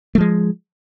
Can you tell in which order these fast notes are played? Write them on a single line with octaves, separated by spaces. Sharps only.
A3 F3 G#3